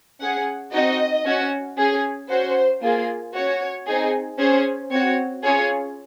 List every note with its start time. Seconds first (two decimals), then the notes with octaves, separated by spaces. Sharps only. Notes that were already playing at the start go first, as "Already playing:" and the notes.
0.21 C#4 G#4 F#5
0.73 C4 D#4 F#4 D#5
1.25 C#4 F#4
1.78 C#4 G#4
2.30 C#4 F#4 C5
2.82 A#3 F4 G#4
3.34 C#4 F#4 C#5
3.87 C4 D#4 G#4
4.39 C#4 G#4 C5
4.91 C4 F#4 C#5
5.43 C#4 F4 G#4 C#5